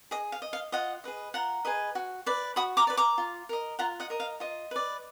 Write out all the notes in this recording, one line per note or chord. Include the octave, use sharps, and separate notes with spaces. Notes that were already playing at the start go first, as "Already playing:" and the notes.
G#4 D#5
F5
D#5
F5
F4 D#5 F#5
G#4 B4 D#5
F4 F#5 A#5
G#4 B4 D#5
F#4
B4 D5
F#4 B5 D#6
A#5 D6
B4 D5
A#5 D6
F4
A#4 D#5
F4 F#5 A#5
D#5 F#5
A#4 D#5
F5
F4 D#5
B4 D5